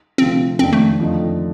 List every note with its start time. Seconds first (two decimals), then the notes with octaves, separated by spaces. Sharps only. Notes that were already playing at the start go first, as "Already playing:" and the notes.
0.18 D2 C3 F3 A3 C4
0.59 F2 D#3 A#3 C4 D4
0.73 A3
1.00 F2 D3 F3 A3 D#4